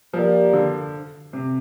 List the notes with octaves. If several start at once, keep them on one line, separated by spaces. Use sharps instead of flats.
F3 A#3 G4 A#4 D5
D3
C3